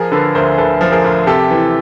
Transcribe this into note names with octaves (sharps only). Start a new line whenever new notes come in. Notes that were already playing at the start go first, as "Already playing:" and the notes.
Already playing: F3 G#4 A#4
D3 A4 B4
D2 A#4 C5
D2 A4 B4
F3
G#4 A#4
D2
C3 G4 A4
E3